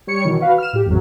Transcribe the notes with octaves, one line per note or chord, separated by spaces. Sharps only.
G3 C#5 C#7
B2 D#3 E3
F#4 B4 F5
F6 E7
A2 G4
G#1 E2 F#3